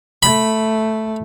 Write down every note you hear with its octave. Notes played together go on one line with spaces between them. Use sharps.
A3 B5